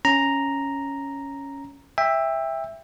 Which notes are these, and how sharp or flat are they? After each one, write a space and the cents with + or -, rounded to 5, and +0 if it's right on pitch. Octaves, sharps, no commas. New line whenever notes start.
C#4 +0 A#5 +0
E5 +0 G5 +25